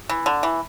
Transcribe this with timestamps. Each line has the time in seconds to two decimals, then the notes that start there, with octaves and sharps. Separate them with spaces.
0.09 E3
0.26 D3
0.43 E3